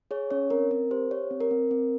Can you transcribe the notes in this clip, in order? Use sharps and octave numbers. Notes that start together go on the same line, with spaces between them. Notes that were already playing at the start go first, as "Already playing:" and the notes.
G#4 C#5
C#4 C#5
C4 A#4
C4 A#4
G4 C5
G4 C#5
C4
A#4
C4
C4